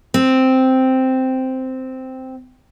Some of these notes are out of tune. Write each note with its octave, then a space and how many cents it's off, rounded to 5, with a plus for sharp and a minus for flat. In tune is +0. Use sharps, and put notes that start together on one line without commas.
C4 -5